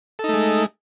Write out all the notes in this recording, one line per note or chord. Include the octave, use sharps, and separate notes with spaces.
G#3 A3 D#4 A4